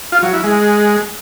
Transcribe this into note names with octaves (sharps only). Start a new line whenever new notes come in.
F4
F#3
E4
G#3